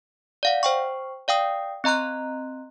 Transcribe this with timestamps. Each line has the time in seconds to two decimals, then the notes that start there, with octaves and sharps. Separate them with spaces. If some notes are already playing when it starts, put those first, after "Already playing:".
0.43 D5 F5 F#5
0.63 C5 G5 C#6
1.28 D5 F5 G5 D#6
1.84 C4 D#5 A#5 C6 F#6